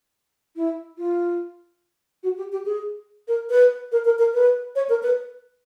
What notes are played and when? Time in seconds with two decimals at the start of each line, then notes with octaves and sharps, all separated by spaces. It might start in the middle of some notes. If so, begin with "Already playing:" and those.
0.56 E4
0.98 F4
2.23 F#4
2.38 G4
2.52 G4
2.65 G#4
3.28 A#4
3.50 B4
3.92 A#4
4.05 A#4
4.19 A#4
4.34 B4
4.75 C#5
4.89 A#4
5.03 B4